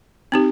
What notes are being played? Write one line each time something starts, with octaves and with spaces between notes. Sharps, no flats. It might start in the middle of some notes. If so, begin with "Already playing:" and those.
C4 D#4 G4